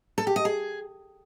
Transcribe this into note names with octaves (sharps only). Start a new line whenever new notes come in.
A4
G4
D#5
G#4